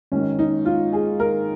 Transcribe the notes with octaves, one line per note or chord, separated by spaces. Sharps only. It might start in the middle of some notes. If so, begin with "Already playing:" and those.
G#1 G#2 D#3 C#4
D#4
F4
G#4
A#4